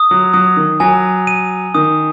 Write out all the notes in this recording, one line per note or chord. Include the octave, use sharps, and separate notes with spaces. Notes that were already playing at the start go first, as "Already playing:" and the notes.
Already playing: D#6
F#3
F#3 D#6
D#3
F#3 G#5
D#7
D#3 D#6